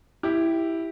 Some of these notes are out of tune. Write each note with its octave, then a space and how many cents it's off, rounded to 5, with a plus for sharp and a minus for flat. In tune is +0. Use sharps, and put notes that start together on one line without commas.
E4 +0 G4 +0